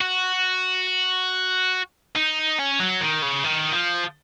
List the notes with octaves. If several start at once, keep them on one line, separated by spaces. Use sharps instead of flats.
F#4
D#4
C#4
F#3
D#3
C#3
D#3
F3